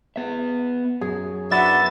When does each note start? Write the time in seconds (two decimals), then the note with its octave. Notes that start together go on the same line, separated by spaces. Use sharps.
0.16 B3 E5
1.01 F#2 G#4
1.51 F#3 B3 D4 E5 A6